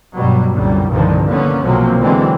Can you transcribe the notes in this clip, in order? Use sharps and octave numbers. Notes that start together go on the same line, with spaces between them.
G2 B2 F#3 G3
C2 F#2 A#2 D3 G3
C2 G2 A#2 D3 D#3 F3
D3 A#3 B3 C#4
B1 C3 F3 F#3 A#3 C4
D3 E3 F#3 G#3 C4